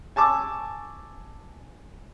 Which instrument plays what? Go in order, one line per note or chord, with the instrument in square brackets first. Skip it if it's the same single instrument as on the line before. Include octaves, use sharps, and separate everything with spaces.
[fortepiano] G#5 A5 C#6 D6 E6